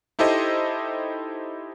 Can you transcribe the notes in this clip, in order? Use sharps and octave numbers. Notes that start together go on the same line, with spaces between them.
D#4 E4 G4 A4 C5 D#5